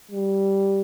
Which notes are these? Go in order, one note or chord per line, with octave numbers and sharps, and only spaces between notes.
G3